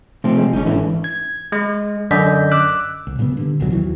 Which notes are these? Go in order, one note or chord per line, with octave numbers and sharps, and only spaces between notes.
C3 F3 A3 C4
G#3
G1 C#4 D#4
G#2 D3 E3 E4
G#6
G#3
F#2 D3 D5 D#5 G6 B6
D6 E6 F#6
C2
A#2 C#3 G3 B3
G2 D3
E1 C2 B2 F#3
D#2 D#3 E3 F#3